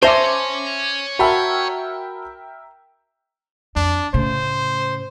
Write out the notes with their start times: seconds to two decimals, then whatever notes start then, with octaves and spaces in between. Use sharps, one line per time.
0.03 C5 C#5 E5 G#5 A5 D6 A#6 F7
1.19 F#4 A#4 E5 G5 A5 B5
3.76 F2 D4
4.14 A2 C#3 C5